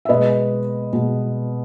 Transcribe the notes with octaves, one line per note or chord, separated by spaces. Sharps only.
E5
B2 G#3 B4 D#5
B2 G#3